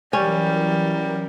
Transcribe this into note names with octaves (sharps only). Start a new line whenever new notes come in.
E3 F#3 G3 C#4 A#4